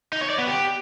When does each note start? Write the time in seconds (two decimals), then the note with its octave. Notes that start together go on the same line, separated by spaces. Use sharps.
0.13 D#4
0.21 C#5
0.30 D5
0.38 B3
0.47 G4